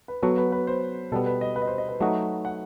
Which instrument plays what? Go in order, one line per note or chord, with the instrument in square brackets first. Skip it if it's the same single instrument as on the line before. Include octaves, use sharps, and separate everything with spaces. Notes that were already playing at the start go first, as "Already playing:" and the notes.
[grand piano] B4
[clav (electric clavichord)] F#3 B3 F#4 [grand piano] A4
[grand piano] B4
B4
C5
[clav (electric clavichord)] B2 G3 B3 [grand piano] A4
[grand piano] B4
D#5
B4
D#5
C5
D#5
B4
[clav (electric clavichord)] F#3 A3 D#4 F#4
[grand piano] F#5